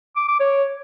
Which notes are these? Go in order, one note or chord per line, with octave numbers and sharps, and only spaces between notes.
D6
D6
C#5